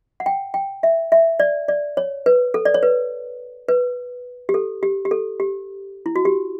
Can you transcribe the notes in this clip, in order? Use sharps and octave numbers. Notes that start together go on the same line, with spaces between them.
F#5
G5
G5
E5
E5
D5
D5
C#5
B4
A4
D5
C#5
B4
B4
G4
A4
G4
G4
A4
G4
E4
F#4
G4